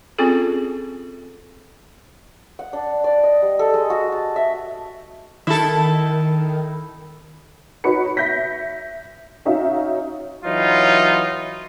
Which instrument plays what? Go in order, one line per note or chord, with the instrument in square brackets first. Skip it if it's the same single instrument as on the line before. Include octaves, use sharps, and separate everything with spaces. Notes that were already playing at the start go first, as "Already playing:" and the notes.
[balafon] C4 C#4 F4 G#4 A4
[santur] F#5
D4
D5
D#5
G3
A4
G#3
F#4
A5
E5
[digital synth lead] D#3 [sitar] E4 A4
[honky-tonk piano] D#4 F#4 B4 C#5 B5 C#7
E5 G6 A#6 B6
C#4 D#4 F#4 E5 F5
[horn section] E3 F#3 D#4 F4